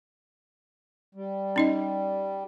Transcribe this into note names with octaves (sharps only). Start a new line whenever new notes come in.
G3
C#4 D#4 D#5